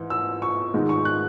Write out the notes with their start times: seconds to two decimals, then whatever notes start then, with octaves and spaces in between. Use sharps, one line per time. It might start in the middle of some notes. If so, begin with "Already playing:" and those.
Already playing: G#2 E3
0.10 E6
0.42 C#6
0.74 G#2 D#3 G#3 D#4
0.89 C#6
1.05 F#6